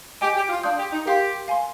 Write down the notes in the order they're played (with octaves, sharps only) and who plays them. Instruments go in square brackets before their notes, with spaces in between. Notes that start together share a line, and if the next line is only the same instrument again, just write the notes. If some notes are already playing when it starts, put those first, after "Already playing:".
[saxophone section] G4 [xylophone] D#5 G#5 D6
[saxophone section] G4
F4
[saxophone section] D4 [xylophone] F5 C6 D#6 G6
[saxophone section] G4
D#4
[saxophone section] G4 [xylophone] A#4 F5 C6
[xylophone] F5 G#5 C6